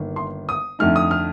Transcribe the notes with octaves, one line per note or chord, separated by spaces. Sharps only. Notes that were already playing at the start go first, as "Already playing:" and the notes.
Already playing: G1 G2 D#3 A#3
C6
D#6
F2 D3 A3 D#4 F6
D#6
F6